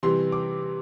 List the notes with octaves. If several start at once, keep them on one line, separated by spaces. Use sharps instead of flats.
C3 E3 G3 C6
D6